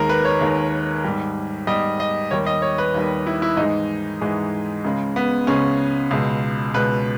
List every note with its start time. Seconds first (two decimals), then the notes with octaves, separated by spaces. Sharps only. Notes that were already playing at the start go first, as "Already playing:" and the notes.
Already playing: D#2 D#3 G#3 A#4
0.09 B4
0.25 C#5
0.41 D#2 D#3 G#3
1.04 G#2 G3
1.67 G#2 G3 D#5
2.00 D#5
2.31 D#2 D#3 G3 C#5
2.46 D#5
2.62 C#5
2.78 B4
2.94 D#2 D#3 G3
3.27 E4
3.42 E4
3.57 G#2 E3 G#3 D#4
4.21 G#2 E3 G#3
4.84 C#2 C#3 G#3
5.16 B3
5.47 C#2 C#3 G#3 C#4
6.11 C#2 B2 G#3
6.74 C#2 B2 G#3 B4